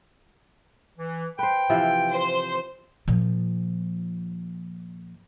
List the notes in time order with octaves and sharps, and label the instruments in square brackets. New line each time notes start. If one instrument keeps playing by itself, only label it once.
[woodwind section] E3
[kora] B4 C5 [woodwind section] G5
[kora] C3 E3 F3
[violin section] C5
[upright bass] A#2 F3